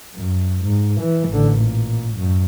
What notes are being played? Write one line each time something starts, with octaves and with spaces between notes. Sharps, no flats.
F#2
G#2
E3
A1 D3
A#2
F#2